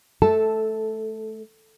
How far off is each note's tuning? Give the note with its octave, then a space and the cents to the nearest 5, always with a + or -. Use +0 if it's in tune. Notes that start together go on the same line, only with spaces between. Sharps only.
A3 -20 A4 +0 A5 -5